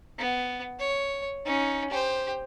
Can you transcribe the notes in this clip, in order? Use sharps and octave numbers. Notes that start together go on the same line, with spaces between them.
B3
C#5
C#4 D#4
G4 C5